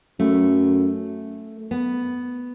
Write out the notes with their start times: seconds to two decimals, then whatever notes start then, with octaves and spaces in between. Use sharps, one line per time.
0.20 F#2 A3
1.71 B3